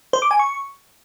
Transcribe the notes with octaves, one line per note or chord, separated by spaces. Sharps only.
C5
D6
G#5
C#6